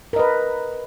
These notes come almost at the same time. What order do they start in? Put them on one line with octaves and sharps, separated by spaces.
A#4 D#5 B4